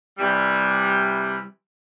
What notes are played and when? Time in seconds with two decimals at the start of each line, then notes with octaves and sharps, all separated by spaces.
0.18 C3 E3 G3